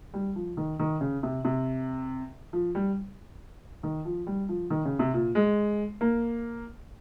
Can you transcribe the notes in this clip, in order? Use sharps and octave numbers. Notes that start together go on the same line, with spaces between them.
G3
F3
D#3
D#3
C#3
C3
C3
F3
G3
D#3
F3
G3
F3
D#3
C#3
C3
A#2
G#3
A#3